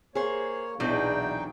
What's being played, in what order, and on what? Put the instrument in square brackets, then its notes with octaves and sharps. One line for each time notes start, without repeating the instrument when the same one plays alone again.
[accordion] A#3 C#5 [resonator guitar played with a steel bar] G#4 C5
[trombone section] B1 E2 [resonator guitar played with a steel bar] A#2 F#3 D4 [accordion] D#4 G5